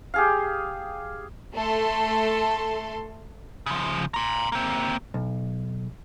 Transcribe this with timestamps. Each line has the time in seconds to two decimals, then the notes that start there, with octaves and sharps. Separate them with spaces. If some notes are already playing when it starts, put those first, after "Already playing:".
0.14 G4 G#4 F5
1.56 A3 A4 C6
3.66 C#3 F3
4.14 A#5 C6
4.52 A#3 C4
5.14 B1